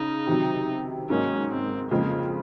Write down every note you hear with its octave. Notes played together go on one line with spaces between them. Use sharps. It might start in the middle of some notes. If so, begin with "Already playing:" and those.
Already playing: C#3 D#4
C3 D#3 F#3
G#2 F#3 A#3 C#4 D#4
C4
F2 C#3 F3 G#3 A#3 C4